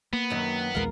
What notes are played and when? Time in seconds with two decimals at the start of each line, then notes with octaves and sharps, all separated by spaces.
0.13 A#3 B3
0.30 F#2 D#3 F#3
0.75 A#1 D#2 G#3 F4 A#4